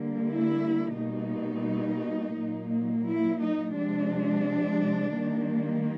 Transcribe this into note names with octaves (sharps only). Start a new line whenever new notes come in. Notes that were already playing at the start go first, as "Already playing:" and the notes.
Already playing: D3 G3 A#3
E4
B2 G3 A#3 D#4
A#2 F#3 A#3
E4
D#4
C3 F3 G#3 D4
D#3 G3 A#3